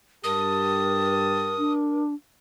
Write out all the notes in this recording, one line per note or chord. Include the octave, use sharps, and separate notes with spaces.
G2 G4 A#4 A5 D#6
D4